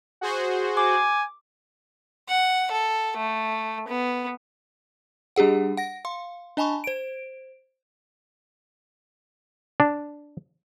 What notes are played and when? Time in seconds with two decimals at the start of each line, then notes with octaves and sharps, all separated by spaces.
0.21 F#4 G#4 C5
0.77 G#5 D6
2.29 F#5
2.71 A4
3.17 A3
3.88 B3
5.36 G3 D4 G4 G#4 F#5
5.77 F#5 A#6
6.05 F5 C6
6.57 D4 D#5 G#5 A5 B5 C#6
6.84 C5 D7
9.80 D4